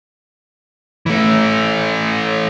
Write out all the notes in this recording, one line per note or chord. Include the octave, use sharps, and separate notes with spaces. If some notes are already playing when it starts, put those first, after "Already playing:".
E3 A3